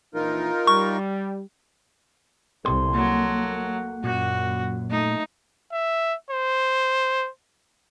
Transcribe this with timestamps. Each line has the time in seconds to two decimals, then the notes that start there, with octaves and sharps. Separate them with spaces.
0.15 A#1 E3 D#4 F4 A#4
0.67 G3 C#6
2.65 C2 C3 A4 C6
2.94 F#3 A#3
4.04 F#2 A#2 F#4
4.90 A3 D#4
5.72 E5
6.31 C5